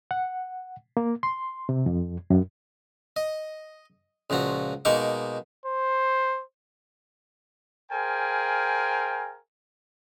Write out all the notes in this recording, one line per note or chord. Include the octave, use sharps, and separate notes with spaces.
F#5
A#3
C6
C3
F2
F#2
D#5
C#2 A#2 F3 F#4
B2 G#3 A#3 D#4 C#6 D6
C5
G#4 A#4 C5 F5 G5 G#5